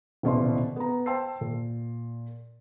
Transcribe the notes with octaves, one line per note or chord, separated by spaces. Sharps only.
D#1 C2 B2 E3 D5 C6
B3 A#5
C5 G5 A5 C6 E6 C7
A#2